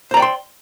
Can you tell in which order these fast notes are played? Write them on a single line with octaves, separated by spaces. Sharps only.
C5 A#5 D5 G5 C6